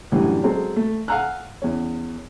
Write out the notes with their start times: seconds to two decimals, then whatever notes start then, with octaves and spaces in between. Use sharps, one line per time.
0.12 F#2 A2 D3 E3 F#3 G3
0.43 F#3 G#3 C4 A4
0.76 A3
1.08 F5 F#5 G#5 A#5 E6 F#6
1.62 E2 C#4